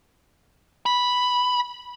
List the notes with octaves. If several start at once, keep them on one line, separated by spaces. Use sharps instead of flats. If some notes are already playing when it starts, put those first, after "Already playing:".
B5